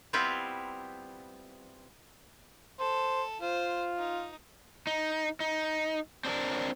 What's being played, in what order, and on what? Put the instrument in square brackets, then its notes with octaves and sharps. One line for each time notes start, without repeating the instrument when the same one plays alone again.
[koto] G3 B3 C4 E4 F4 G4
[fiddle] A4 [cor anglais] C5
[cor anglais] F4 [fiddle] C5
[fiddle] D#4
[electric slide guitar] D#4
D#4
C4 D4 G#4 A#4